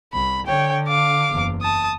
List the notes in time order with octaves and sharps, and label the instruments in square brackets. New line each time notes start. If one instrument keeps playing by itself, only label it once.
[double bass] C2 [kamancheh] B5
[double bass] D3 [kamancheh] C#5 G5
[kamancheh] F5 D6
[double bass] F#1 E2
[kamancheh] A5 D#6